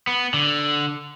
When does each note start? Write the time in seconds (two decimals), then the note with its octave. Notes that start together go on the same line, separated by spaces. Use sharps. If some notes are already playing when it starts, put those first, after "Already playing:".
0.07 B3
0.34 D3